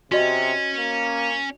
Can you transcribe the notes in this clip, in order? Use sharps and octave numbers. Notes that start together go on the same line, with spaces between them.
C3 C#4 F#4 D#5 C6
A#3